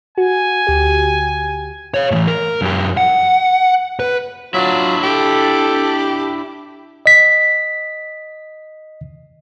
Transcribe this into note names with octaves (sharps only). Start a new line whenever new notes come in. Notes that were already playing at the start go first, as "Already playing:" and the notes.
F#4 G#5
D2 G4
C#5 F5
A2 E3
A#4
F#2 G4
F#5
B4
F#3 D4 E4 F4
G4 A4
D#5 B6